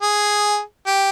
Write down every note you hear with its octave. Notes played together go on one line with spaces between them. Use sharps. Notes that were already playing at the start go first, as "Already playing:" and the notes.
G#4
G4